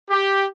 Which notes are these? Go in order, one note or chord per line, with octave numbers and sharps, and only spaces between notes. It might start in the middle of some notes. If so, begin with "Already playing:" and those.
G4